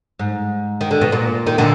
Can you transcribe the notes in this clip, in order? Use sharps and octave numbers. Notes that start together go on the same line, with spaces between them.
G#2
D#3
D3
B2
A#2
D#3
A#2 D3